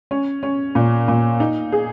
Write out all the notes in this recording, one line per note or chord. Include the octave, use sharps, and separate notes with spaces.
C#4
C#4
A#2
A#2
D#4
G#4